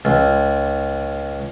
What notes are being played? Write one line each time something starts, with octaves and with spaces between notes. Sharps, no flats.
C#2